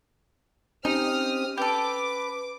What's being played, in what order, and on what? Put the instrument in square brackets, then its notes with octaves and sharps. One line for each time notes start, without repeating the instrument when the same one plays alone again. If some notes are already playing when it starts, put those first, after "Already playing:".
[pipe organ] C4 G4 [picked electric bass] C#4 [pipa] D#4 [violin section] D#6 F6
[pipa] G4 A4 [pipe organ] B4 [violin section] D6